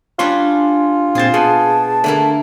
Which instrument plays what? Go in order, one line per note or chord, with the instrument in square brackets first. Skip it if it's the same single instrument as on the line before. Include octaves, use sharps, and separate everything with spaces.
[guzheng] G3 C#4 D4 [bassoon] F4 [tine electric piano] C6
[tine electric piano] A#2 C4 A6 [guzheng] G#4 C5
[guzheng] B2 [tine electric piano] G#4 [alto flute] A5
[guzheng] D3 A#3 E4 [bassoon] A3